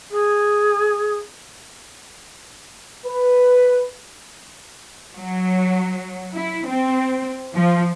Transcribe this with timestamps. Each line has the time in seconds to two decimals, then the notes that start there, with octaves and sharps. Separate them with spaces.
0.11 G#4
3.06 B4
5.15 F#3
6.33 E4
6.67 C4
7.54 F3